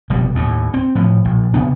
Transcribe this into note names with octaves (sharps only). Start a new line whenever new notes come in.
F1 B2 G3
D#2 A2
C4
A2 F3
A#1
C3 B3 D4